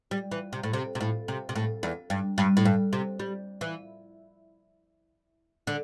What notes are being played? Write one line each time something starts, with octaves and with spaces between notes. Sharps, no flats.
G3
E3
C3
A2
C3
C3
A2
C3
C3
A2
E2
G2
G2
A2
G2
C3
G3
E3
D3